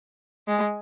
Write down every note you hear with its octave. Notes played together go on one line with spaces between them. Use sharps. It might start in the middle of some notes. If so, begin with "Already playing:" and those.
G#3